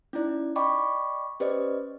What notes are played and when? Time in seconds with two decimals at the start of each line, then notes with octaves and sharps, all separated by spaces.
0.13 C#4 D#4 E4 D5
0.56 D5 D#5 G5 B5 C#6 D6
1.40 C#4 G4 B4 C5 D5 D#5